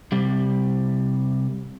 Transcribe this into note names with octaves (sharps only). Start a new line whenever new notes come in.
C3 G3